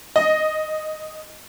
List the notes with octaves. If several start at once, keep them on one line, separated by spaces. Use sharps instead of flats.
D#5